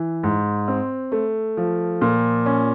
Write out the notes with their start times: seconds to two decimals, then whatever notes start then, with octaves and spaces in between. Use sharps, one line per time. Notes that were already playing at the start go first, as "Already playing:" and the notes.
Already playing: E3
0.23 G#2
0.68 C4
1.12 A3
1.57 F3
2.02 A#2
2.46 C#4